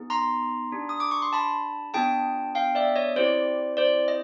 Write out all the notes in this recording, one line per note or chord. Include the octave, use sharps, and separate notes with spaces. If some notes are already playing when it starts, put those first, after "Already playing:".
Already playing: B3 D#4 G#4
A#5 C6
D4 G4
D#6
D6
C#6
C6
A5 B5
B3 D4 F4 G#4 G5 A5
F5 G5
D5 E5
C#5 D#5
C4 E4 G4 C5 D5
C5 D5
D#5